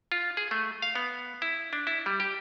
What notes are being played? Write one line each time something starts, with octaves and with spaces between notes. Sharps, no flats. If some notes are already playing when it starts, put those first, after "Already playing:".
F4
G#4
A3
F5
B3
E4
D4
E4
G3
G4